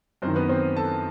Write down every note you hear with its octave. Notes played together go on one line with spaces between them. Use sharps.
F#2 D#3 C4 C5
B3 B4
C4 C5
A4 A5